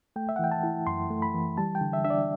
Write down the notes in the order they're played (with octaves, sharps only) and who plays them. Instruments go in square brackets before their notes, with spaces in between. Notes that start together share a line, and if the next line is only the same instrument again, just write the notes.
[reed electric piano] A3 G5
E5
F#5
E3 G5
A5
E4
F#2 C6
A3
B5
E3
G3 A5
G5
D3
E5
D4 E5
D5